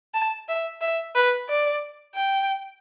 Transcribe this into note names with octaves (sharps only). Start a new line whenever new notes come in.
A5
E5
E5
B4
D5
G5